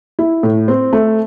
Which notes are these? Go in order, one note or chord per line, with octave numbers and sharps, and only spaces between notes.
E4
A2
C4
A3